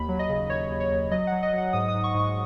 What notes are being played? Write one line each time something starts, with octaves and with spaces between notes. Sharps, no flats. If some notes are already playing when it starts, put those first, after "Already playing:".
Already playing: D#2 B5
F#3
D#5
C#3
D#2 C#5
D#2
C#5
D#2
F#3 D#5
F#3 F#5
D#5
F#3 F#5
G#2 D#6
D#6
G#2
C#6
G#2 C#6